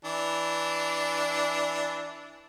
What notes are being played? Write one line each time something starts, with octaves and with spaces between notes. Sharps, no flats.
E3 D4